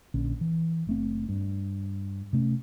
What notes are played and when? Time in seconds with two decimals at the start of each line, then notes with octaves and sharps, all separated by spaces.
0.14 A#1 D3 C#4
0.41 E3
0.87 F#1 A3 C4
1.29 G2
2.33 C3 A3 C#4